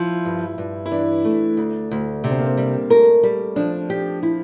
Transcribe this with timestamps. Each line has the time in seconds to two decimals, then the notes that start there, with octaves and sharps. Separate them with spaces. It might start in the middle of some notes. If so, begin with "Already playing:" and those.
Already playing: F3 E4
0.25 G2
0.58 G2
0.86 E4
0.92 E3 D4
1.25 A3
1.57 D2
1.91 D2
2.24 C3 D4
2.31 C4
2.39 A#3
2.46 C4
2.57 G3
2.90 A3 A#4
3.23 G3
3.56 F3 D4
3.90 G4
4.23 E4